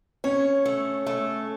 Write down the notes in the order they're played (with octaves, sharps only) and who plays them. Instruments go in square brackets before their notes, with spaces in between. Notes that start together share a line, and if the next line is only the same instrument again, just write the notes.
[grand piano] C#4 [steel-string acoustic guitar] C#5
[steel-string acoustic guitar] A3
A3